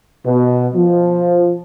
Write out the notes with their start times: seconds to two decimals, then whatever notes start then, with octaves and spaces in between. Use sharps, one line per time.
0.25 B2
0.74 F3